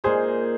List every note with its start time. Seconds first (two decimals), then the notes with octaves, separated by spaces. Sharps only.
0.04 A#2 G#3 D#4 G#4 C5